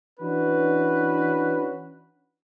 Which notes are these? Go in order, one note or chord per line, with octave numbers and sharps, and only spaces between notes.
E3 C#4 D4 F#4 B4